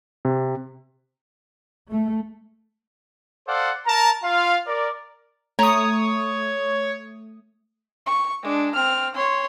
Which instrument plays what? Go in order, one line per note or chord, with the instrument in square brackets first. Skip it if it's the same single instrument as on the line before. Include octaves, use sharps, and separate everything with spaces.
[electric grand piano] C3
[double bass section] A3
[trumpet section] A4 C5 D5 F5 F#5
A#4 A5 A#5
F4 F5
A#4 D5
[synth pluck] A3 D#6 [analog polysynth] C#5 [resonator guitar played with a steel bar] A#5
[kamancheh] C#6
G#3 D4
C4 F6
C#5 C6